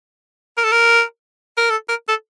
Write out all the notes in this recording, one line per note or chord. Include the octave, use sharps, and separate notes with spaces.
A#4
A4
A#4
A#4
A4
A#4
A4